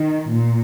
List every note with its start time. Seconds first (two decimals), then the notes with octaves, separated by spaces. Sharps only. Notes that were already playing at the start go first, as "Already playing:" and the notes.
Already playing: D#3
0.31 A#2